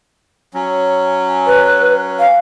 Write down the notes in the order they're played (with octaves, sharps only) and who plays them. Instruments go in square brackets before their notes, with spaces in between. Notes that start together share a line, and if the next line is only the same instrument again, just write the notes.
[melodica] F#3 C#4
[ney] B4
F5